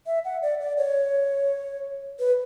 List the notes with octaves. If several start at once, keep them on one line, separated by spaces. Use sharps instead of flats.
E5
F#5
D5
D5
C#5
B4